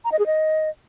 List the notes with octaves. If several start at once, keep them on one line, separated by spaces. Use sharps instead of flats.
A#5
D#5
G#4
D#5